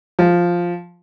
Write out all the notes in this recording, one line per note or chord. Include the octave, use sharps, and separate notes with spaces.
F3